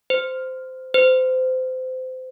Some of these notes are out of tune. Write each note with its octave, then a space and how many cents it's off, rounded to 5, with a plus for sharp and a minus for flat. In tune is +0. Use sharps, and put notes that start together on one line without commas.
C5 -15
C5 -25